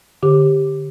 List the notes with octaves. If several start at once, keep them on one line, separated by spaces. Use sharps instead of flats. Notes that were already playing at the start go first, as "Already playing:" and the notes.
D3 G4